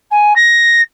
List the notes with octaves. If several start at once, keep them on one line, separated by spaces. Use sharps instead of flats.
G#5
A#6